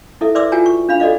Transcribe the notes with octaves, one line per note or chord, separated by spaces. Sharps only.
E4 A4 E5
B4 D5 E5 C6 D6 E6
F4 F#4 G5 G#5 A#5
C#6
D4 F5 B5
F#4 A4 D5 D#5 F5